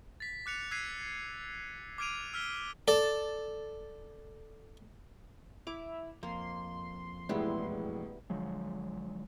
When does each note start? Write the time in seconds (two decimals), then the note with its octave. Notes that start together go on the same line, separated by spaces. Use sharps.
0.20 A6 B6
0.46 D6 F#6 C#7 F7
0.71 E6 F#6 G#6 B6 C7 D#7
1.98 D6 F6 G#6 D7 D#7 F7
2.34 E6 F6 B6 G7
2.88 A4 D5
5.67 E4 D6 F7
6.23 F2 A#3 C6
7.29 E1 A2 G3 G#3 B3 E4
8.30 D3 F3 F#3 G#3